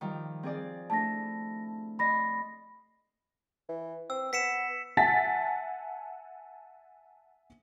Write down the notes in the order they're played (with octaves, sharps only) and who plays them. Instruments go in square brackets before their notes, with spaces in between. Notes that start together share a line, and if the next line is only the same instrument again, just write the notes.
[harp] D#3 F3 G3
C4 G#4 D5
[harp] A3 D4 E4 [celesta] A5 A#6
[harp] D5 D#5 C6 [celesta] B5 A#6
[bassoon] E3
[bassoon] C4 [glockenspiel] E6
[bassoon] B3 [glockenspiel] B6 C#7 E7
[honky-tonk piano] E5 F#5 G#5 A5 A6 B6